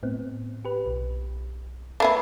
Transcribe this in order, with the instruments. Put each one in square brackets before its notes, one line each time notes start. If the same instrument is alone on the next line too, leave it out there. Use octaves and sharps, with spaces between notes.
[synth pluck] A2 B3 C4
G4 B4
B1
[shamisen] A3 B3 E4 [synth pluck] D6 E6 C7